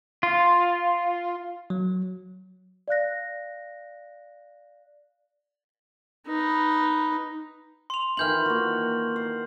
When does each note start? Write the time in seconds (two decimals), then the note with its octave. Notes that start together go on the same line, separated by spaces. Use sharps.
0.23 F4
1.70 F#3
2.88 D5 F5 F#6 A#6
6.27 D#4 B4
7.90 C6 F7
8.17 D#3 E3 F4 F6 G6 F#7
8.46 A#3 F#4
9.16 C5